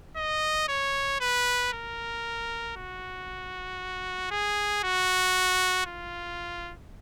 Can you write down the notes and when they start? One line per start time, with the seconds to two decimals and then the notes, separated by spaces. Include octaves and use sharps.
0.17 D#5
0.69 C#5
1.21 B4
1.73 A#4
2.76 F#4
4.31 G#4
4.84 F#4
5.86 F4